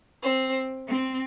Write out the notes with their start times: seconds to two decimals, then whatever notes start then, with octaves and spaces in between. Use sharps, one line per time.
0.22 C4
0.88 C4